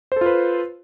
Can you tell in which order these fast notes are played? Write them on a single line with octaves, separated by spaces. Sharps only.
C5 A4 F4 B4